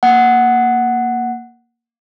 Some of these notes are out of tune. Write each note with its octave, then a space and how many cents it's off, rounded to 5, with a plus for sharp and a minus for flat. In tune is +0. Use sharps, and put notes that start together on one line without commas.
A#3 +0 F#5 +0